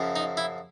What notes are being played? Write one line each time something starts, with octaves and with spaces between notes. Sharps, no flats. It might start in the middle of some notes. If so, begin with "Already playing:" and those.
Already playing: F#2 C#3 F3
D#4
E4